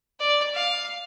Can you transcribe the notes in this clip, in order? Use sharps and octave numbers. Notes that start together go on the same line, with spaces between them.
D5
F5